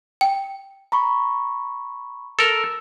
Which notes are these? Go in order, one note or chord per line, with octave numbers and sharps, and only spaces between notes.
G5
A#5 B5 C#6
A4 A#4 E6